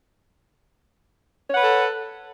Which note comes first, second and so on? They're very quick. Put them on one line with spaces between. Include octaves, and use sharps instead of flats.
C#5 F#5 B4 A4